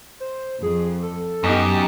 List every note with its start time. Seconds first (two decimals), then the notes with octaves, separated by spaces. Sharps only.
0.20 C5
0.63 F2 G#4
1.03 A4
1.44 F#2 B3 D#4 G4